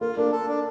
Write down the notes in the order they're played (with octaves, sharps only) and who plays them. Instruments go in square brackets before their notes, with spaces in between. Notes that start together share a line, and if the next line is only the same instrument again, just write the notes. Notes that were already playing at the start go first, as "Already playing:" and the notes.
[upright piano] A#3 [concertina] F4
[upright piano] A#3 [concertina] D4
[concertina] A4
D4